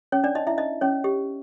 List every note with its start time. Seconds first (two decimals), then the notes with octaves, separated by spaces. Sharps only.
0.12 C#4 C#5
0.24 D4 D5
0.35 D#4 D#5
0.47 E4 E5
0.58 D#4 D#5
0.81 C#4 C#5
1.04 G4